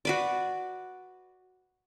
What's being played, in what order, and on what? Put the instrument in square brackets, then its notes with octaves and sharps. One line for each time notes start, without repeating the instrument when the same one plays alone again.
[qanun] F#4 B4 D5